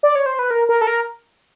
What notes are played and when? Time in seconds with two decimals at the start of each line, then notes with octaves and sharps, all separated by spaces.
0.03 D5
0.15 C#5
0.26 C5
0.39 B4
0.51 A#4
0.69 A#4
0.81 A4
0.87 A#4